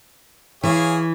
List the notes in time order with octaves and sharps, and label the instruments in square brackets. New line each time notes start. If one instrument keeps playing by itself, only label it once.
[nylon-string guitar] E3 [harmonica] G#4 C#5 F5